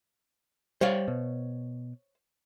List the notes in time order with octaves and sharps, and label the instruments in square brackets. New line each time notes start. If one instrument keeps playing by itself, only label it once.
[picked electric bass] G3 [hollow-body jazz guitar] C5 C#5 F5
[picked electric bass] B2